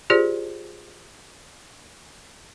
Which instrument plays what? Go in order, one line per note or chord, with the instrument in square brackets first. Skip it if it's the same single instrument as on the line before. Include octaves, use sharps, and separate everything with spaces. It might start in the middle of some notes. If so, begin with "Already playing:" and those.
[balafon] F4 G4 G#4 C5 D5